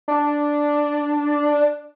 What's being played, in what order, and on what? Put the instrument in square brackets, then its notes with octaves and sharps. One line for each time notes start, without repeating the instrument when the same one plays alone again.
[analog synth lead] D4